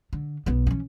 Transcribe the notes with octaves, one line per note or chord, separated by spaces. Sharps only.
D3
B1 B3
E3 C#4